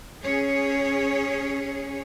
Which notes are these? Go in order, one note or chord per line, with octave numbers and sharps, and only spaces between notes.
C#4 G#4 C#5